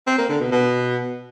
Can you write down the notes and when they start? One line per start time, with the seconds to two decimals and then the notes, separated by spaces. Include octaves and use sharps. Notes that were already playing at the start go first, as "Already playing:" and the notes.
0.07 C4
0.18 A#3
0.29 D3
0.41 B2
0.52 B2